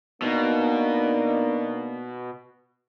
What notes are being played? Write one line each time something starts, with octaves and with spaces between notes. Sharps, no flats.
B2 A#3 D4 D#4